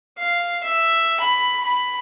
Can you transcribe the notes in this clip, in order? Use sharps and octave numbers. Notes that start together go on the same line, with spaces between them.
F5
E5
B5
B5